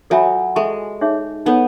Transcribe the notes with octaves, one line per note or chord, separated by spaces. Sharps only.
F#3 A4 C#5 E5 G#5 B5
G#3 A4 E5 A5 C#6
D#4 G#4 C#5 E5
B3 D#4 A4 C#5